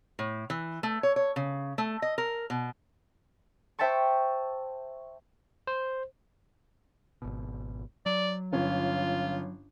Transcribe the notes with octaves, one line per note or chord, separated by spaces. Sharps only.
A2
E3
A3
C#5
C#5
C#3
A3
D#5
A#4
B2
C5 E5 G5 A5 C#6
C5
G#1 B2
F#3 D5
G1 C#4 F4